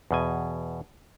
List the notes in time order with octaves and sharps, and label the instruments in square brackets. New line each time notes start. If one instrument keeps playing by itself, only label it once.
[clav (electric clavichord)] E2 B2 G#5